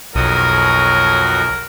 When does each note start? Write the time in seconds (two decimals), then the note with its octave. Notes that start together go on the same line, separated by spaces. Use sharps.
0.15 B1 F2 F#4 A#4 C#5 D#6